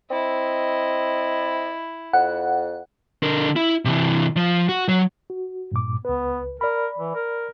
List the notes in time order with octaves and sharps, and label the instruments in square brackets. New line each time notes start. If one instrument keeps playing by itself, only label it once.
[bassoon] C4 [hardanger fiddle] E4 [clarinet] D#5
[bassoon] F2 [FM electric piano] F#5
[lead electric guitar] D3 A#4
E4
C3 E3
F3
F#4
F#3
[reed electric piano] F#4
G2 A#2 D6
[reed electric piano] C#2 B4 [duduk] B3
[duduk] A#4 [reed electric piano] D5 B5
[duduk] E3
A#4